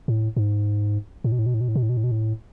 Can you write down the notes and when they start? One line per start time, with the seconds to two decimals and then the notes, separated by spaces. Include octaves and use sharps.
0.08 A2
0.37 G#2
1.24 A2
1.32 B2
1.39 A2
1.46 B2
1.54 A2
1.61 B2
1.68 A2
1.76 B2
1.83 A2
1.89 B2
1.97 A2
2.04 B2
2.11 A2